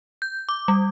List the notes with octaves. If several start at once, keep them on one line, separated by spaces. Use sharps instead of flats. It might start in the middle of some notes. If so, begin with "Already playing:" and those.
G6
D6
G3